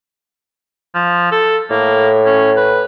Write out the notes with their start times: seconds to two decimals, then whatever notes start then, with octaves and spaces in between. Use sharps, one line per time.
0.95 F3
1.32 A4
1.70 A2 A#3
2.26 C#4
2.57 B4